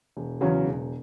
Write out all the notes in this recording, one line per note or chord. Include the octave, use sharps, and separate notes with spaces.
E1
E2 C#3 F#3 C#4
E1